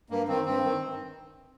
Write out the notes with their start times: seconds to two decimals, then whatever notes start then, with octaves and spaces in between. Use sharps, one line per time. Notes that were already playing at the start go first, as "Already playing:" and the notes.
0.10 G2 A#3
0.28 D#3 C4
0.46 G2 C4
0.63 D#3
0.80 G2